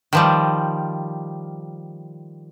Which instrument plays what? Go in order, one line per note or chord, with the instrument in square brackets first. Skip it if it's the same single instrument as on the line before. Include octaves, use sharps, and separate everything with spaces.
[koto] D#3 F3 G3